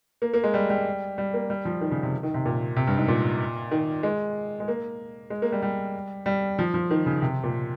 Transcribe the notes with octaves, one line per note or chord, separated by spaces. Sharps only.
A#3
A#3
G#3
G3
G3
G3
A#3
G3
F3
D#3
C#3
C3
D#3
C3
A#2
C3
G2
G#2
A#2
D#3
G#3
G#3
A#3
G#3
A#3
G3
G3
G3
F3
F3
D#3
C#3
C3
A#2